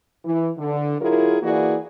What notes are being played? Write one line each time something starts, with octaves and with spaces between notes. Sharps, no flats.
E3
D3
F#3 E4 F4 G#4 A#4
E3 A#3 E4 F#4 G#4 D5